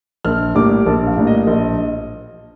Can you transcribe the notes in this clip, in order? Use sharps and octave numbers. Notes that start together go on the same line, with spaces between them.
A#1 F6
A2 G3 A#3 D4 D6
A#1 A5
F5
A2 G3 A#3 D4
D#5
A#1 D#5